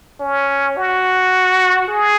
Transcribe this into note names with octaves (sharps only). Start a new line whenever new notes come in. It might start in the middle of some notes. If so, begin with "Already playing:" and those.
C#4
F#4
G#4